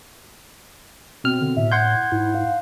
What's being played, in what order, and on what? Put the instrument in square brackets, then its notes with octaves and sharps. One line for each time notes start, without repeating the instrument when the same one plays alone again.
[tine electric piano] B2 F6 [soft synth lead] C4
[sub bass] D3
[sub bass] A2 [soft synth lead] E5
[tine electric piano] F#5 C6 G6 [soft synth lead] G#6
[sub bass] G#2 [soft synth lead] E4
[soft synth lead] F5